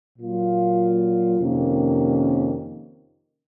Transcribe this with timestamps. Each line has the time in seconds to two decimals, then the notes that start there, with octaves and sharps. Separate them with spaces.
0.19 A#2 F#3 A#3 F4
1.37 F2 C3 D#3 A#3 C#4